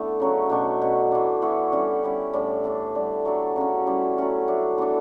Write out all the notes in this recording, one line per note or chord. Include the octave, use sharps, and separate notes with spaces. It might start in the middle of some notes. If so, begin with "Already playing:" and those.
Already playing: D3 A3 B3 E4 A4
C#3 F#3 C#4
B2 A3 D4 F#4
B2 F#3 C#4
E3 A3 D4
E3 B3 F#4 C#5
D3 G3 C#4 F#4
G3 C#4 E4
A2 G3 D4 A4
E3 A3 D4 A4
D3 G3 D4
F#3 A3 D4
C#3 F#3 C#4
G3 C#4 E4 A4
F#3 A3 C#4 F#4
F#3 A3 D4
E3 B3 D4 A4